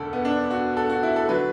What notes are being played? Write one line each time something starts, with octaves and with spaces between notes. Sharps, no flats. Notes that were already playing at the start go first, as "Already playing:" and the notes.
Already playing: E1 D2 D3 A4
B3
D4
F#4
A4
F#4
E4
A4
D3 F#3 B4